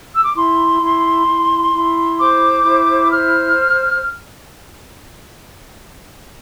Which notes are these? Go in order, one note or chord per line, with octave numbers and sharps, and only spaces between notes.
E6
D6
E4 C6
E4
E4
E4
C5 D6
E4
C5 F6